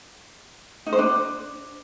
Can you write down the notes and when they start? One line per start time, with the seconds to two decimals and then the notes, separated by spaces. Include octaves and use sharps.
0.86 D#4
0.93 C5
0.99 D4